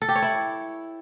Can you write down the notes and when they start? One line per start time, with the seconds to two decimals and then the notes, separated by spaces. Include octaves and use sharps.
0.02 A4
0.08 G4
0.15 C#5
0.22 E4